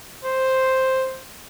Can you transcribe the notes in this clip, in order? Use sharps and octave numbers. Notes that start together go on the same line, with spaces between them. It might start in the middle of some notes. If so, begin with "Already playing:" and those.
C5